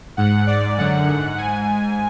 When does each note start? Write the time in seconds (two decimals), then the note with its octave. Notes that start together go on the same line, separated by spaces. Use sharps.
0.17 G#2 F#5
0.47 G#2 D5
0.78 F#2 D3 F#5
1.07 G#2
1.38 G#2 G#5
1.69 G#2